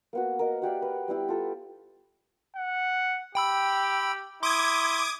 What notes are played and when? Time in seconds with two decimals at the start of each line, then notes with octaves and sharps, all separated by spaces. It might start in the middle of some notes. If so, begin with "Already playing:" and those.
0.13 A#3 B3 F#4
0.39 A#4 D#5
0.62 F#4 G4 D5 F5
0.82 B4
1.08 G3 B3 E4 G4
1.28 F4 A4
2.56 F#5
3.35 G4 G5 B5 E6
4.43 E4 C6 D6 D#6 G#6